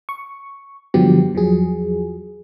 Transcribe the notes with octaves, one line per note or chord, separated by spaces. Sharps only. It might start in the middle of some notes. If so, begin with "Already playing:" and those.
C#6
G2 D3 F3 F#3 B3 G4
E2 F3 F#3 G#4